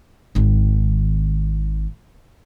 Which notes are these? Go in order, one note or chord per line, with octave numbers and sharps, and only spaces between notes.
G#1 D#3